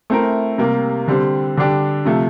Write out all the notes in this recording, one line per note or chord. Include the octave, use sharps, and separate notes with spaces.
A3 C4 E4 A#4
C3 G3 A#3
D3 G3 C4
D3 G3 D4 G4
C3 F3 A3